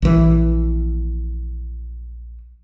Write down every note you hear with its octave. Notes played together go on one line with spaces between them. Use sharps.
A#1 E3